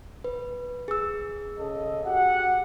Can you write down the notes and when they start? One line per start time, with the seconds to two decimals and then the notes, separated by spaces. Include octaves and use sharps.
0.24 B4
0.88 G#4 E6
1.58 C#3 A4 D#5
2.05 F#4 G4 F#5